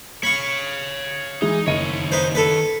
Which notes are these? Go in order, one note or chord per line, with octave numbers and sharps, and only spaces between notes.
C#5 F5 B5 C#6
E3 G#3 D#4 E4
F#1 D#3 C#5 D#5 D#7
D#4 B4 C5
A4 B4